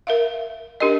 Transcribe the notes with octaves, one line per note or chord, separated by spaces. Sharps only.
A#4 E5 F5
D4 G4 A#4 D#5